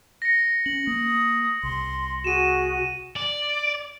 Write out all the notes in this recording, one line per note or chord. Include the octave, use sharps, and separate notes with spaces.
A#6 C#7
C#4 F#7
A#3 D#6
C2 C6
F#4 G#4 D#7 E7
D5